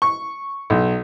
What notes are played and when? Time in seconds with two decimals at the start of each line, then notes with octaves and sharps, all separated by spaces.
0.02 C#6
0.70 B1